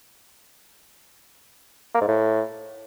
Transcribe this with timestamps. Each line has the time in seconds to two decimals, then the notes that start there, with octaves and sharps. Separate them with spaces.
1.95 A#3
2.01 G#2
2.08 A2